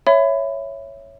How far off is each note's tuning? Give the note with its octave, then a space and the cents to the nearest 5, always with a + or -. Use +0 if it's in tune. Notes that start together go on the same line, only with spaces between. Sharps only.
C#5 +0 E5 +10 B5 +25